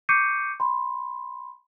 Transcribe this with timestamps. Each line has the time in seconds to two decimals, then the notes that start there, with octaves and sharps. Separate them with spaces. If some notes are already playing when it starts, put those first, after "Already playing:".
0.09 C#6 D6 G6 C7 C#7 D#7
0.60 B5 C6